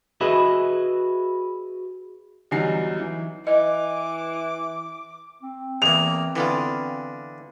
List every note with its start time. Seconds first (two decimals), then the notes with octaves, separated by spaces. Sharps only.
0.21 F#4 G#4 B4 D#5 E5
2.51 E2 F#3 G3 D#4 C7
2.99 E3
3.47 E3 D#5 D6
5.43 C4
5.82 E2 A#3 F7
6.36 D3 E3 B3 F4